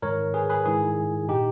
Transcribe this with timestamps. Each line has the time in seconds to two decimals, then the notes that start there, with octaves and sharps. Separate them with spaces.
0.02 G#2 D#3 A#4 C#5
0.34 G#4 B4
0.49 G#4 B4
0.66 G#2 D#3 E4 G#4
1.29 A#2 D#4 G4